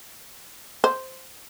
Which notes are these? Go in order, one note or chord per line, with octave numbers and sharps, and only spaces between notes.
C5